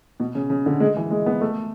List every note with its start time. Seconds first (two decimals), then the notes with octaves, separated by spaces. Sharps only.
0.20 B2
0.35 C#3
0.50 C#3
0.66 D3
0.80 G#3
0.97 E3
1.11 G#3
1.26 B3
1.41 A3